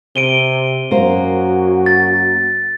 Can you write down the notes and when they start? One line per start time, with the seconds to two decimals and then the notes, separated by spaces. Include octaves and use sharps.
0.16 C3 D7 D#7 G7
0.91 F#2 A#3 F#4 C5
1.86 A6